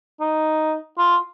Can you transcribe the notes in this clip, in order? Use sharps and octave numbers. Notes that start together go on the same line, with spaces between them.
D#4
F4